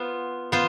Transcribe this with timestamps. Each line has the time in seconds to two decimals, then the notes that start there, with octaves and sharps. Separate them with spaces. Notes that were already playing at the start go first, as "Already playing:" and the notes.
Already playing: B3 F4 C5
0.52 B3 F4 C5